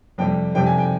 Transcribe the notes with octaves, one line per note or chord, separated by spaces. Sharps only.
F2 C3 G3 G5
F2 C3 G3 G5
G#5
G5